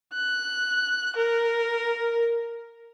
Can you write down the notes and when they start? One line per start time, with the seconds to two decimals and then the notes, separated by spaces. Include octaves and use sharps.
0.13 F#6
1.16 A#4